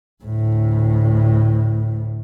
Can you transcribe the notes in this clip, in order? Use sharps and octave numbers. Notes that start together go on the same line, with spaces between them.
D2 A2